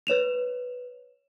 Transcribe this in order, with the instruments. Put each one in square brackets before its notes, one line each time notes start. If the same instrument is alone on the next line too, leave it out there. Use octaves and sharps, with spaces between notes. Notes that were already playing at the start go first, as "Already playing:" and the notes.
[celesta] B4 C#5 E7 F7